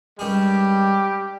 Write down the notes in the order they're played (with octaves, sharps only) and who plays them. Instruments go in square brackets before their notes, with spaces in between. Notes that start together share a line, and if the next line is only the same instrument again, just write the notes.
[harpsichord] G2 D#3 G#3 C#4 G#4 [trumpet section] G3 G4